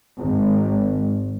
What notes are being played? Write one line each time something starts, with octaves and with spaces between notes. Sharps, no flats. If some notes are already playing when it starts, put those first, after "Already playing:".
G#1